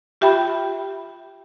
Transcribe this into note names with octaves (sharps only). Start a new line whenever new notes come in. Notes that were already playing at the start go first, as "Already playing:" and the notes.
F4 G4 E5 G5 A5 B5